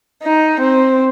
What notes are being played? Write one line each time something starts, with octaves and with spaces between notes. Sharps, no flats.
D#4
C4